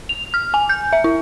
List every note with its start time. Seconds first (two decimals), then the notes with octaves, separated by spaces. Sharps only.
0.09 F7
0.34 F6
0.54 G#5
0.69 G6
0.93 E5
1.04 E4